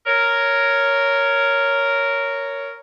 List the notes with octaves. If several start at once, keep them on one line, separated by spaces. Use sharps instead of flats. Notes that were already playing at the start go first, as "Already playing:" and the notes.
A#4 C#5